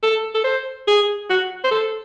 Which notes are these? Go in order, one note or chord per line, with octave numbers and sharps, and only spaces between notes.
A4
A4
C5
G#4
F#4
C5
A4